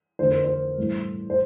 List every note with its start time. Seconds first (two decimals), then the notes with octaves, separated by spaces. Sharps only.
0.19 F2 D3 F3 A3 C5
0.31 A#4
0.44 C5
0.78 A1 G2 E3 A3
1.30 C5